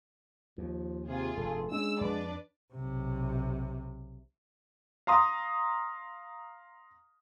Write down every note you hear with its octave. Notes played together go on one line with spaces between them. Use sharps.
D#2 F3
C3 F4 G#4
F1 G2 A4
G#3 C#4 D4 E6
F2 D4 B4 D5
B1 C3
F5 A#5 C6 D#6